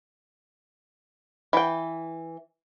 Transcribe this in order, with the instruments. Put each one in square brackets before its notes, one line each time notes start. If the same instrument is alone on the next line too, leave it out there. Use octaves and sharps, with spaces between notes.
[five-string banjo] E3 G5